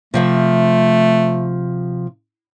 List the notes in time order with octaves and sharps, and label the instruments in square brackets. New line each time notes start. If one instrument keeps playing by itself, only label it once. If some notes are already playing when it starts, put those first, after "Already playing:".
[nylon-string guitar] C3 F3 E5 [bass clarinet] A3